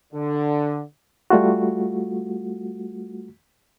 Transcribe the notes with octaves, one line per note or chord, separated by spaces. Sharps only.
D3
G3 A3 F4 F#4